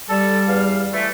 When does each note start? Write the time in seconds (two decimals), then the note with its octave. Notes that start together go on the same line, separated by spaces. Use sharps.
0.09 G3 A4
0.48 E2 F5
0.93 E3 A3